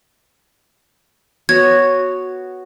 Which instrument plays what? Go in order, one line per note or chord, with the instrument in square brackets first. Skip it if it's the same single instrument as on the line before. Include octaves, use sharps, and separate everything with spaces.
[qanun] B3 F#4 C#5 [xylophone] G#6